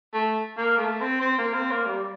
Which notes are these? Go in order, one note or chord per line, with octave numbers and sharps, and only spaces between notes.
A3
A#3
A3
C4
C4
A#3
C4
A#3
G3